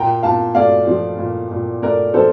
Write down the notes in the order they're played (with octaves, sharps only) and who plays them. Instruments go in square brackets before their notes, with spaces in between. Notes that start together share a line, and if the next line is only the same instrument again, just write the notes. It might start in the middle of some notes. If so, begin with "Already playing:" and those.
Already playing: [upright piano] A#2 G5 A#5
A#2 F5 A5
A3 D5 F5
F3
A#2
A#2
A3 A#4 D5
F3 A4 C5